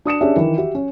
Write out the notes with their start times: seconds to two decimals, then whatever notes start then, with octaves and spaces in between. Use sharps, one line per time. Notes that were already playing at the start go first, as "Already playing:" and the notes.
0.05 D4 D#6 C#7 E7
0.21 C#4 D4 G4 G#4 E5
0.36 D#3 E3
0.56 F#4 G4 E5
0.75 C#4